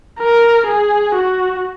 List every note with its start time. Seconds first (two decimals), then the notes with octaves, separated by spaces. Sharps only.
0.19 A#4
0.67 G#4
1.15 F#4